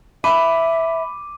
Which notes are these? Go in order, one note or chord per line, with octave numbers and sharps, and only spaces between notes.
E5 B5 D6 D#7